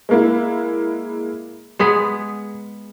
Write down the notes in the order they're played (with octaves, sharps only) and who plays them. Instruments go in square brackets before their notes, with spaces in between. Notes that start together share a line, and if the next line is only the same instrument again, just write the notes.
[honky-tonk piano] G#3 A#3 E4
[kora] G#3 B3 G#4 [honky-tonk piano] B6 C#7